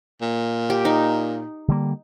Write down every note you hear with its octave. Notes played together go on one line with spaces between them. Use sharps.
A#2
G4
D#4
D3 G3 A#3